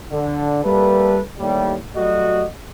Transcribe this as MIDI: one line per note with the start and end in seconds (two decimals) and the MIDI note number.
0.12 0.63 50
0.63 1.19 55
0.63 1.19 57
0.63 1.19 58
0.63 1.19 69
0.63 1.19 71
1.39 1.74 39
1.39 1.74 45
1.39 1.74 55
1.96 2.46 54
1.96 2.46 55
1.96 2.46 57
1.96 2.46 66
1.96 2.46 75